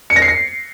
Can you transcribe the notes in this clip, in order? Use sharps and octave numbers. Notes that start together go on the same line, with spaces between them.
C#7
A#6
C7
A#6